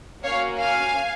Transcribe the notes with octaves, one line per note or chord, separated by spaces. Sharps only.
A#3 C#4 F#4 C#5 F5
F5 G#5